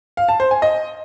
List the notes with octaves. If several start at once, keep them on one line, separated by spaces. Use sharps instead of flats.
F5
A5
C5
G#5
D#5